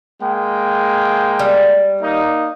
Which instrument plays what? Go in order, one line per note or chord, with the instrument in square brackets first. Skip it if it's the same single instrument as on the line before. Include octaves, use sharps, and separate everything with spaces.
[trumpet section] G#3 A#3 G5
[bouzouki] G3
[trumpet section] A#3 D#4